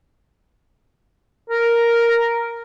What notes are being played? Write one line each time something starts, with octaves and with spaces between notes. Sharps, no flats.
A#4